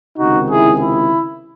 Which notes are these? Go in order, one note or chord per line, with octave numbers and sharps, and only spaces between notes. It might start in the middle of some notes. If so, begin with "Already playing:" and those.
C#2 C3 D#3 D#4 F#4
E4 G#4
E4